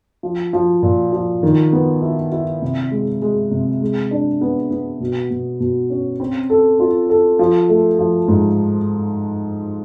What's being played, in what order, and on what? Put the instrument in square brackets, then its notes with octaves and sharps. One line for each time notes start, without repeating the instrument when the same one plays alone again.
[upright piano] F3
F3
A#2
F3
D#3
B3
E4
E4
C3
G#3
G#3
C3
G#3
D4
B3
B3
B2
B2
B2
C#4
C4
A4
F4
A4
F3
A3
F3
G#2